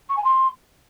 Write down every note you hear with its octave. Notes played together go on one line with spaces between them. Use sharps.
C#6
G#5
C6